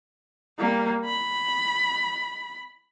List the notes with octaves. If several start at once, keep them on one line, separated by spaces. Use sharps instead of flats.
G3 A#3
B5